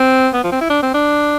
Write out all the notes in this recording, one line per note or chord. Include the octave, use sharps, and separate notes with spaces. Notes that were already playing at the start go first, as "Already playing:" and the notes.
Already playing: C4
B3
F3
C4
E4
D4
C4
D4